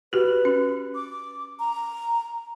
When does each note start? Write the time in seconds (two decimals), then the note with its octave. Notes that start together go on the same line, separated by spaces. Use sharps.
0.13 F#4 G4 B4
0.45 C#4
0.95 D6
1.59 A#5